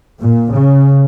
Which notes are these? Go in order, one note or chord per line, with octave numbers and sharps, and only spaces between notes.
A#2
C#3